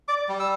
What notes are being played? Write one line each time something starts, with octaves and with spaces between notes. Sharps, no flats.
D5 D6
G3
E6